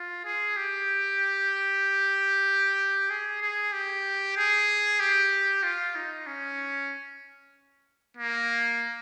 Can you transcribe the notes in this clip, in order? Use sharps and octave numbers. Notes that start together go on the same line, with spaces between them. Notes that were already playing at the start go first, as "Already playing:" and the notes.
Already playing: F4
G#4
G4
G#4
G#4
G4
G#4
G4
F4
D#4
C#4
A#3